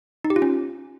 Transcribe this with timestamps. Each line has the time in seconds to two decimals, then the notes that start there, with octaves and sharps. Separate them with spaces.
0.24 D#4
0.30 G4
0.36 F4
0.42 C#4